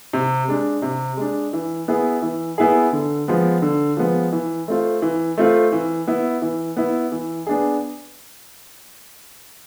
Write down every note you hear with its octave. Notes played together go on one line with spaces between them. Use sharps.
C3
G#3 D4
C3
G#3 D4
E3
B3 E4 G#4
E3
B3 E4 G#4
D3
F3 G#3 B3
D3
F3 G#3 B3
E3
A3 C4 F4
E3
A3 C4 F4
E3
B3 E4
E3
B3 E4
E3
B3 D4 G#4